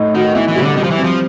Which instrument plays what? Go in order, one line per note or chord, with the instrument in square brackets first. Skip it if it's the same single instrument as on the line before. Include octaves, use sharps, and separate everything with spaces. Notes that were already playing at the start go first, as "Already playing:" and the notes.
Already playing: [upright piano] A2 D#4
[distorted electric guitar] D#3 [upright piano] F#4
[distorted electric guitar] E3 [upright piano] B3
[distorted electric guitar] E3
[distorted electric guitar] C#3 [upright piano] G3
[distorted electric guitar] D3
[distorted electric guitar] D#3 [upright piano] G3
[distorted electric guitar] F3
E3
[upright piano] C4
[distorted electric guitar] F3